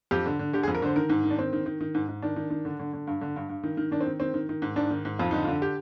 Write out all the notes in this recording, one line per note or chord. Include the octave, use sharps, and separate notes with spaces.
F2 G4
D3
D3
D3 G4
G#4
F2
A#4
D3 C5
D#3 A#4
G#2
D#3
D4
D#3 C4
D#3
D#3
D#3
G#2
G#2
D#3 D4
D#3
D#3
D3
D3
D3
G2
D3
G2
G2
D#3
D#3
D#3 D4
C4
D#3
D#3 C4
D#3
D#3
G#2
G#2 D4
D#3
G#2
F2 F4
D3 D#4
F4
D3
G4